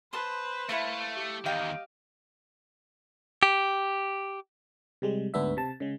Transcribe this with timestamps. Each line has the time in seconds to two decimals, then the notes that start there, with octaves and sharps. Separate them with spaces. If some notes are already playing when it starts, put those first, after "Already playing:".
0.13 B4 C5 A5 C6 D#6
0.69 A3 E4 A4 F5
1.12 G4
1.46 E2 D#3 D#5 F5 G5
3.43 G4
5.02 C3 G3 G#3
5.34 D2 G#2 B3 D4 E5
5.57 C3 A5
5.80 C#3 G#3